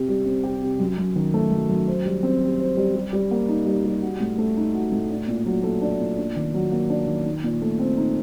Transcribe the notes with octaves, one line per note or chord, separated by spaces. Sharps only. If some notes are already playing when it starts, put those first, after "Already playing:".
Already playing: C3 G4
G3
C4
G4
C3
F#2
F#2
D#3
A3
F#2
F#2
C5
G3
C4
G4
C5
G3
G3
G3
A#3
D#4
G3
G3
F#4
A2
A3
D#4
F#4
A2
D4
A#2
F#3
A3
D4
A#2
D4
D#3
F#3
A#3
D4
D#3
D#4
A#2
A3
C4
D#4